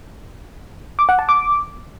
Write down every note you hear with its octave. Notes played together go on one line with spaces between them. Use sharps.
D6
F#5
A5
D6